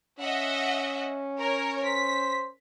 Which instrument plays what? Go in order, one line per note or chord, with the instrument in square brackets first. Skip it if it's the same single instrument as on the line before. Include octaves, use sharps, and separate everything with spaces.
[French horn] C#4 [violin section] D#5 E5 F#5
[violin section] A#4 C#5
[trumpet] C5 [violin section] B6